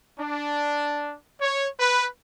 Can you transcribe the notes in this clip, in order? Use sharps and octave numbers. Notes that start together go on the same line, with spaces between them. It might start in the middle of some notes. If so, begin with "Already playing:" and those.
D4
C#5
B4